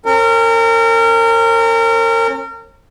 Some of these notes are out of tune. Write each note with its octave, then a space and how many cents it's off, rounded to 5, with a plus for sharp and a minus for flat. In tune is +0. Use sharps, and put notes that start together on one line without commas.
C#4 -40 A#4 -30